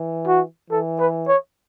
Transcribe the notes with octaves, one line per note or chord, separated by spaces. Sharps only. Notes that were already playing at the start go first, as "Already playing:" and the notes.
Already playing: E3
F#4
E3 A4
B4
C#5